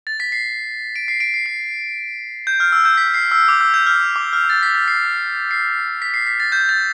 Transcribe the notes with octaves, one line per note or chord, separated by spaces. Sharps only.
A6
B6
C7
D7
C7
D7
C7
C7
G6
F6
E6
G6
B6
C7
E6
D6
E6
G6
F6
D6
F6
A6
B6
A6
C7
C7
B6
C7
B6
A6
G6
A6